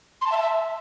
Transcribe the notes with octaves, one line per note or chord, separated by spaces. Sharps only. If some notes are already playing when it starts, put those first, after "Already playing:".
C6
A5
E5
A5
E5